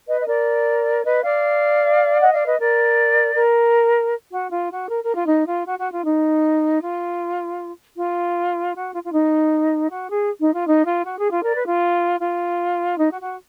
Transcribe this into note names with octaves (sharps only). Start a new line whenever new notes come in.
B4 D#5
D#5
A#4 D5
B4 D#5
D5 F5
D#5 F#5
D5 F5
B4 D#5
A#4 D5
A#4
F#4
F4
F#4
A#4
A#4
F4
D#4
F4
F#4
F#4
F4
D#4
F4
F4
F#4
F4
F4
D#4
F#4
G#4
D#4
F4
D#4
F4
F#4
G#4
F4
A#4 D5
B4
F4
F4
D#4
F#4
F#4